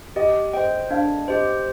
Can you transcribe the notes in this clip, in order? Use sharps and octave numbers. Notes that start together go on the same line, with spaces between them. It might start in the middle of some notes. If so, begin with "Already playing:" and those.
G4 D#5
C5 D#5 G5
D4 F5
G4 C5 D#5